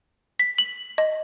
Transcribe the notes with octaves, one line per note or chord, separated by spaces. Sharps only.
B6
F#7
D#5